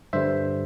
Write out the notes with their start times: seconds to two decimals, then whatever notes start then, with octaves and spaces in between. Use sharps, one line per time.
0.13 G2 D3 G3 C5 E5